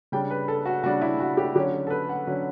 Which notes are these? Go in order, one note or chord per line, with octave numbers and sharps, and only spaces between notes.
C#3 G3 D4 G5
B4
A4
F#4
C#3 G3 D4 F#4
E4
F#4
G4
D3 F#3 C#4 G4
A4
B4
F#5
D3 F#3 C#4